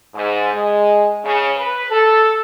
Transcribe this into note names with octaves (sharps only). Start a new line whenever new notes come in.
G#2
G#3
C#3
B4
A4